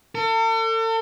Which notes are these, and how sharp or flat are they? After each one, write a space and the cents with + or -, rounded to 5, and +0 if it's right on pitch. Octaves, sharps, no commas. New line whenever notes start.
A4 +40